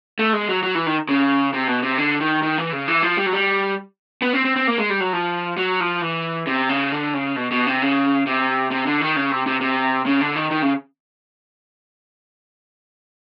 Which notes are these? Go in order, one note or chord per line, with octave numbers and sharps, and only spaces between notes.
A3
G#3
F#3
F#3
E3
D#3
C#3
C3
B2
C3
D3
D#3
D#3
E3
C#3
E3
F3
G3
F#3
G3
B3
C4
C4
C4
A#3
G#3
G3
F#3
F3
F#3
F3
E3
C3
C#3
D3
C#3
B2
B2
C3
C#3
C3
C3
D3
D#3
C#3
C3
C3
C3
C#3
D3
D#3
D#3
C#3